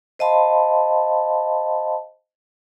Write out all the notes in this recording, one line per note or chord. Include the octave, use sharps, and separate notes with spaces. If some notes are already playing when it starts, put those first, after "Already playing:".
C5 D#5 F5 A5 B5 C6